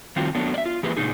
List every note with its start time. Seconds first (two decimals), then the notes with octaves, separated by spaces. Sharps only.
0.16 D#3 G3 C4 F4 F#4
0.35 F#3 A3 B3 D4
0.54 D5 E5
0.66 F4
0.83 E3 A#3 G4 G#4 B4
0.97 A#2 C#3 D#4 G#4